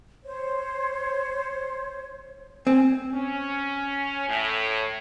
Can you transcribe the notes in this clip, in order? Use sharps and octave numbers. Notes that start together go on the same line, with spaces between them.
C5 C#5
C4 G#5
C#4
A2